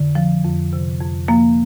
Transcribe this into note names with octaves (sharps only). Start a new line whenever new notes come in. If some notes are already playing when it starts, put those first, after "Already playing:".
Already playing: F2 D3
F3
F2
C3
F2
F3 A#3